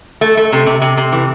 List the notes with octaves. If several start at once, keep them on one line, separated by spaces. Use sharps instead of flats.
A3
A3
C3
C3
C3
C3
E3